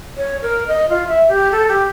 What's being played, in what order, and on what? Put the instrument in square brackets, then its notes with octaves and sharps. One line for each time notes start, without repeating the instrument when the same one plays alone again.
[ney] C#5
A#4
D#5
F4
E5
G4
A4
G4